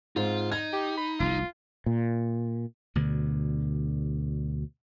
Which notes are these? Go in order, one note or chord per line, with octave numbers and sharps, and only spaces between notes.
G#2 C4 F4
D#4 G#6
G4
B5
F1 C2 F4
A#2
D2 B2 D3